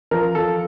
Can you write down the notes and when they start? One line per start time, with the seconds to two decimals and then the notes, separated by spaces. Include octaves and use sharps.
0.11 F3 A#4
0.35 F3 A4